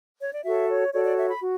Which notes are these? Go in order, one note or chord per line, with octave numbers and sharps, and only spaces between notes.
C#5
D5
F#4 A4 C#5 E5
C#5
F#4 A4 C#5 D5
D5
E5
B5
F#4